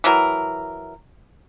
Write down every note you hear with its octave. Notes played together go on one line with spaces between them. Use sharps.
E3 F#3 A#4